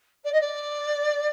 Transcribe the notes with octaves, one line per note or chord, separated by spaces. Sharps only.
D5
D#5
D5